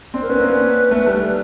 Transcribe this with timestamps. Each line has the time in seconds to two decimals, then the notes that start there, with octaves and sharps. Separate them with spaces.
0.14 C4 D4
0.22 A#4
0.29 B3 C#4 B4
0.40 A#3 C4
0.50 B3 C#4
0.91 A3 B3
1.06 G3 A3
1.22 A4